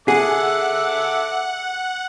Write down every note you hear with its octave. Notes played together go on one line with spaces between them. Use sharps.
G#4 A4 E5 F#5 D6